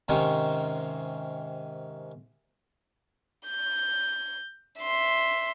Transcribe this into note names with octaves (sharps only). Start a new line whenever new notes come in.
G#2 C3 D#3 C#4 D#4
G6
E5 C6